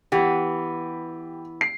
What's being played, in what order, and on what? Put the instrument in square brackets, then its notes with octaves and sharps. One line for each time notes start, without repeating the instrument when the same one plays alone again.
[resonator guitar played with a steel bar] E3 B3 [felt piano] G4
[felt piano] C7